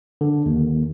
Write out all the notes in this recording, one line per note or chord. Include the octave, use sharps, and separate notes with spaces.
D3
D#2